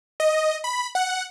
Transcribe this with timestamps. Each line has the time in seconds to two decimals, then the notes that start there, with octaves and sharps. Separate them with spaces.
0.20 D#5
0.64 B5
0.95 F#5